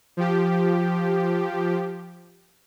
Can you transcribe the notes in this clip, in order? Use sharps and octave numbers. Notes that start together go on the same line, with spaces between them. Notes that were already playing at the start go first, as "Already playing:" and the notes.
F3 G4